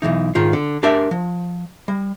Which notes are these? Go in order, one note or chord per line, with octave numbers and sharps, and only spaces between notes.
B1 F#2 E3 D#4
G#2 D#3 F4
D3
D4 G4 A#4 D5 E5
F3
G3